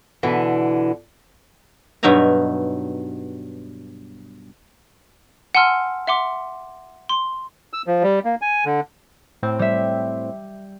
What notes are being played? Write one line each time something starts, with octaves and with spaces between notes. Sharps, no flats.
B2 D3 E3
G2 B2 F#3 D#4 E5 A#5
F#5 G#5 A5 C6 E6 F6
E5 F#5 C6 D6
C6
E6
F3
G3
A#3
G#5
D3
A2 C4
G3 E5